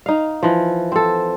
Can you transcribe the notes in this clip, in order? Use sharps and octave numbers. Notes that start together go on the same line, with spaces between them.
D#4 F5
E3 F3
C4 A4